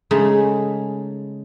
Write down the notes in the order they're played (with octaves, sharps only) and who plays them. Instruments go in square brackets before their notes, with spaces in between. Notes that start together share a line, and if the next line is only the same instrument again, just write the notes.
[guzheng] C#3 G#3 A3 D#4 G#4